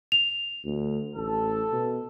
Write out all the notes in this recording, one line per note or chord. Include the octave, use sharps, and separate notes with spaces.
F7
D2
A1 A4
B2